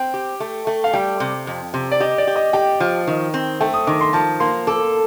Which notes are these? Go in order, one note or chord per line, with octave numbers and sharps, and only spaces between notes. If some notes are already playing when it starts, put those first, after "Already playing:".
Already playing: C4 G5
G4
A3
A3
F5
G3 G5
C3
F2
C3
D5
G4 D#5
D5
G4
D#5
G4 G5
F3
D#3
C4
A3 G5
D#6
D#3 D6
C6
F3 A5
A#3 C6
A4 D6